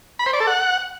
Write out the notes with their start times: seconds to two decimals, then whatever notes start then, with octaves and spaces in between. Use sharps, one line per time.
0.19 B5
0.26 C5
0.33 D5
0.40 A4
0.47 F#5